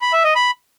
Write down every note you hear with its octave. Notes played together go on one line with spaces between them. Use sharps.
B5
E5
D#5
B5